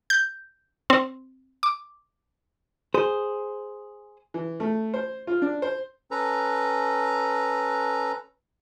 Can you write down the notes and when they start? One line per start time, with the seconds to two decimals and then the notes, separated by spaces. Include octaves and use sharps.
0.10 G6
0.90 C4
1.63 D6
2.94 G#4 C5
4.34 E3
4.60 A3
4.94 C5
5.27 F4
5.42 D4
5.62 C5
6.11 C#4 A4 B4 A#5